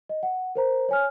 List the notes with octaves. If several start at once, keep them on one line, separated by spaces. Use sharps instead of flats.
D#5
F#5
A#4 C5 A#5
C#5 G#5 F6